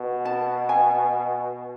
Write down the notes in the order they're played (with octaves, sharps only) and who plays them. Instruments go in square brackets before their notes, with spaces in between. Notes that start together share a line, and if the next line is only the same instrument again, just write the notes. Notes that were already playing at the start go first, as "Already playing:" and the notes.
Already playing: [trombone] B2
[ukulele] A5
G#5